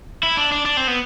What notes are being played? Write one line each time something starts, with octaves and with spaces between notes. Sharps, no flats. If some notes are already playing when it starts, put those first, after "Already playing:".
E4
D4
D4
D4
C4
B3